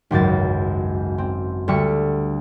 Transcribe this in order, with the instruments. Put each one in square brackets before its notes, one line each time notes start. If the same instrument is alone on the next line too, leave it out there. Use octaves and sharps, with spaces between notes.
[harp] G#1 C#2 F#2 A6
C4
D2 D3 G3 C#6 E6 C#7